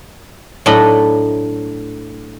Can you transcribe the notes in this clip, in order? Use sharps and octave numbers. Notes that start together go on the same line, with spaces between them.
A2 F#3 D4 D#5 B5